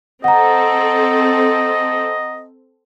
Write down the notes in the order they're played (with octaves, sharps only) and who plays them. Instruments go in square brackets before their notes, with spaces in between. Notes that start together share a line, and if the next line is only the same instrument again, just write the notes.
[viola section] C4 A4 [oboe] D#5 [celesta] F#5 A#5